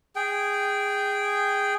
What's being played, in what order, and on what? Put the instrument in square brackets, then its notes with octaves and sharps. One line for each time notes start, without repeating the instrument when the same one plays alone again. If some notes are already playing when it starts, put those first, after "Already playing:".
[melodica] G#4 G5